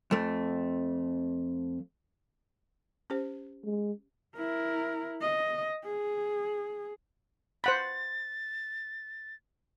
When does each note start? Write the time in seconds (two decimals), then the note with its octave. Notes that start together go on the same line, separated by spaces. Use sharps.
0.11 F2 A3
3.10 C#4 G4 C5
3.65 G#3
4.36 E4 A#4
5.22 D#5
5.85 G#4
7.64 C5 F#5 B5 A6